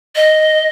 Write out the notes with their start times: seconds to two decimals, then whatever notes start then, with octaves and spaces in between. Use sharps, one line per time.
0.16 D#5